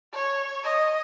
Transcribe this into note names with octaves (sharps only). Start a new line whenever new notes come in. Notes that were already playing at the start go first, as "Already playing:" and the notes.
C#5
D#5